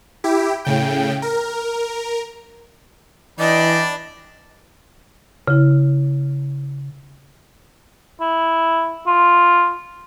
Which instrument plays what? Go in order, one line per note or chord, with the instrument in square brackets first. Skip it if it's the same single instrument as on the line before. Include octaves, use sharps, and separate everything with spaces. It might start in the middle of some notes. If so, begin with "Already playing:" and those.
[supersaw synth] E4 G4
A2 C#3 G5
A#4
[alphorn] E3 [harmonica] D4 G5 B5 [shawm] D5 [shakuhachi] D#5
[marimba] C#3 E4
[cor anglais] E4
F4